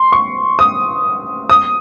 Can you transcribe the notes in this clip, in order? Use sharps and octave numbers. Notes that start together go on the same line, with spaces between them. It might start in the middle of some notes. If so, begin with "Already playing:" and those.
Already playing: C6
C#6
D#6
D#6